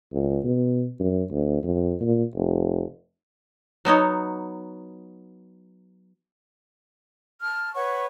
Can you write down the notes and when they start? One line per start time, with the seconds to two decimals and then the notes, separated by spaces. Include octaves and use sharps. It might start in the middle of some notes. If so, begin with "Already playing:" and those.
0.12 C#2
0.44 B2
1.00 F#2
1.31 D2
1.63 F2
2.00 A#2
2.35 F1
3.85 F#3 B3 D#4 C#5
7.41 A5 F6
7.74 B4 C#5 F#5 C#6